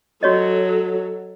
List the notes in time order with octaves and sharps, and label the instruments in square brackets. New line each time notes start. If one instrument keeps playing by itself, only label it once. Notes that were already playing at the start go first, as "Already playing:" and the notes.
[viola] F#3 A4 [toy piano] F#4 C#5 D#5